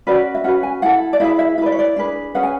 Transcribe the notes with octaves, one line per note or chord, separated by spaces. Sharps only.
C#4 F#4 B4 D5
E5
C#4 F#4 B4 F#5
G#5
E4 A4 F#5
D5
E4 G#4 B4 E5
E5
E4 B4 D5 E5
C#5
D5
D4 G#4 B4
C#4 G#4 B4 F#5
G#5